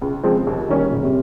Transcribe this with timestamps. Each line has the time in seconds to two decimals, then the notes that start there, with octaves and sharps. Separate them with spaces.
0.02 C#2
0.23 C#3 F3 G#3 C4
0.47 D#2
0.69 D#3 G3 A#3 C#4
0.91 F#1 A#2
1.03 C3